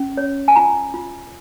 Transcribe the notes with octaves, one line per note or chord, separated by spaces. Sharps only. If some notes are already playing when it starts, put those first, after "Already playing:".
Already playing: C#4
C#5
G#5
F4 A#5
F4